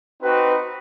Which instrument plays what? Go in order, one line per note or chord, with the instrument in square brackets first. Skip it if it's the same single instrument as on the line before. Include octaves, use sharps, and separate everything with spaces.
[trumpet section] C4 D#4 F#4 B4